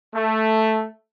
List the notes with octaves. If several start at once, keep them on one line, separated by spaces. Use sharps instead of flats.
A3